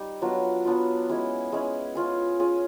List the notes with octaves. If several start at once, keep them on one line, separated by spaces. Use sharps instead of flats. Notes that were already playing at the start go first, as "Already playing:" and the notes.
Already playing: G3 D#4
F#3 B3 D4 F4
F#3 B3 D4 F4
G#3 C#4 E4
G#3 C#4 E4
C#4 F4 G#4
C#4 F4 G#4